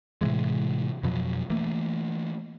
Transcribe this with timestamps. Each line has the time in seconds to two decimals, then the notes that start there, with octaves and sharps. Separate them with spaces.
0.21 A2 C3 E3 G#3
1.03 F2 B2 F3 F#3
1.50 E3 A3 A#3